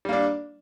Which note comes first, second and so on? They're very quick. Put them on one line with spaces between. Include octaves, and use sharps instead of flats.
G3 A#3 D4